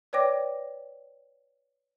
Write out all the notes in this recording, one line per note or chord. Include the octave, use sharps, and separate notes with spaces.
B4 C#5 D5 G5 D6 A#6